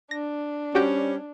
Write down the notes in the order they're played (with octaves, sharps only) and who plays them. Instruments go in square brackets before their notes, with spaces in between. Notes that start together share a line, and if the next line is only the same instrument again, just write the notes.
[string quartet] D4 [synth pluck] A#6
[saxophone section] G3 C4 C#4 [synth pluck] F#4 G4 G5